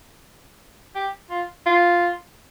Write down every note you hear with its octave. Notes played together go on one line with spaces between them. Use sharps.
G4
F4
F4